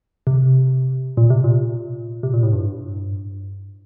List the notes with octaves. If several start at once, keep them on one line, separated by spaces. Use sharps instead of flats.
C3
A#2
C3
A#2
C3
A#2
A2
G2